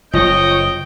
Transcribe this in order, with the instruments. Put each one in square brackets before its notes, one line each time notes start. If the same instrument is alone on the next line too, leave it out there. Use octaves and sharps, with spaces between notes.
[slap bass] F#1 [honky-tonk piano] F3 [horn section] C#5 D#5 [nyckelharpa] G5